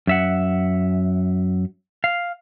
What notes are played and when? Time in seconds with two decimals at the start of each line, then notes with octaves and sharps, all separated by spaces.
0.07 F#2 E5 F#5
2.04 F5